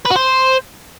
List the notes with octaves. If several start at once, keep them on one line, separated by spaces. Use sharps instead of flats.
B4
F#4
C5